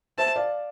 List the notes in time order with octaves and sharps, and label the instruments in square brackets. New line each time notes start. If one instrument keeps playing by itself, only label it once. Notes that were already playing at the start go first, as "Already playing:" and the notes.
[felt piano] C5 E5 [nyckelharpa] A5
[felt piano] D5 F5